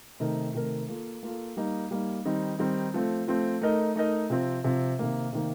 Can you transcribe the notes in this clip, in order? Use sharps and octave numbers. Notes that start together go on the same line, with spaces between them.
C3 D#3 A3 D#4 A#4
C3 D#3 A3 D#4 A#4
A#3 F4 A4
A#3 F4 A4
G3 A#3 D#4
G3 A#3 D#4
D#3 G3 C4 D#4
D#3 G3 C4 D#4
F3 A3 C4
F3 A3 C4
A3 D#4 A#4 D#5
A3 D#4 A#4 D#5
C3 F3 C4
C3 F3 C4
C3 D#3 A#3
C3 D#3 A#3